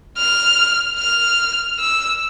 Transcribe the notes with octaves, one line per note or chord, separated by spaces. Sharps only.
F6
F6
E6